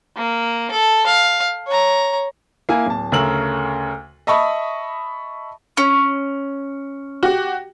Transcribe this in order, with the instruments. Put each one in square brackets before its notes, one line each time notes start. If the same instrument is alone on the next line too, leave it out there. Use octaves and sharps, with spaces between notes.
[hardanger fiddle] A#3
A4
F5
C#5 A#5
[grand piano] A#3 E4 G#5
D1 A5
D2 C#3 A3 A#4 E6 F#7
D#5 E5 A5 B5 C#6 D#6
[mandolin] C#4
[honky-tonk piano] F#4 G4